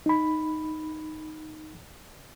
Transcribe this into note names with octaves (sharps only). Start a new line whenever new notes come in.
D#4 B5